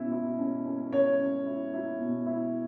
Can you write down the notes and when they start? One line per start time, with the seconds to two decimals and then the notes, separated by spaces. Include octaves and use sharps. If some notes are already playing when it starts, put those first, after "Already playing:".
Already playing: B2 C#4 E4
0.12 E4
0.39 C#4
0.65 C#4
0.92 C#4 C#5
1.20 C#4
1.46 E4
1.73 E4
2.00 B2
2.26 E4